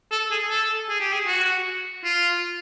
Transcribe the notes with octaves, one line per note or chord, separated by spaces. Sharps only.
A4
G#4
A4
G#4
G4
G#4
F#4
F4